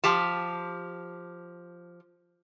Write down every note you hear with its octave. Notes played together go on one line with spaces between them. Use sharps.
F3 G4 A5